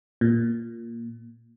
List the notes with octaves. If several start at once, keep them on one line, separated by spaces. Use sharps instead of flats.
A#2